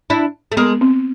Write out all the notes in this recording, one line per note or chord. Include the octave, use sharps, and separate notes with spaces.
D4 E4
A3
G#3 A#3 B3
C4